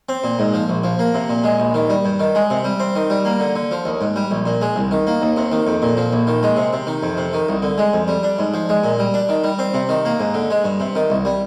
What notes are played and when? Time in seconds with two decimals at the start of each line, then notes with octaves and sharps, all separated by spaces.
0.09 C4
0.24 A#2
0.39 G#2
0.54 F3
0.69 A#1
0.84 F3
0.99 A#3
1.14 C3
1.29 A#2
1.44 G#3
1.60 A#1
1.74 D#3
1.89 G3
2.05 G2
2.20 D#3
2.35 G#3
2.50 C3
2.64 G3
2.80 C4
2.95 D#3
3.10 G3
3.25 A#3
3.40 D3
3.55 D3
3.71 F3
3.85 D#2
4.01 G#2
4.16 G3
4.31 A#1
4.46 A#2
4.61 G#3
4.76 C2
4.91 D#3
5.07 A#3
5.22 D#2
5.37 C3
5.52 D#3
5.67 F2
5.82 A#2
5.97 F3
6.13 A#1
6.27 D#3
6.43 G#3
6.57 C3
6.73 C3
6.87 D#3
7.03 F2
7.17 C3
7.33 D#3
7.49 C2
7.62 D3
7.78 G#3
7.93 F2
8.08 G3
8.23 D4
8.39 G#2
8.54 F3
8.69 G#3
8.84 A#2
8.99 G3
9.14 D4
9.29 D#3
9.44 G3
9.59 C4
9.74 C3
9.89 D#3
10.05 A#3
10.20 G#2
10.34 D3
10.50 G#3
10.64 G2
10.80 C3
10.95 D#3
11.10 C2
11.25 G3